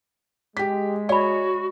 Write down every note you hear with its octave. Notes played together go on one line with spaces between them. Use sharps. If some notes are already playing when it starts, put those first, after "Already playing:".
G#3 G4 B6
F#4 C#5 D5 B5